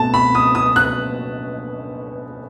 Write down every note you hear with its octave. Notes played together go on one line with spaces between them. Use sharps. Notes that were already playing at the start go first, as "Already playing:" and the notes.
Already playing: B2 A3 C4 A5
B5
D#6
D#6
F#6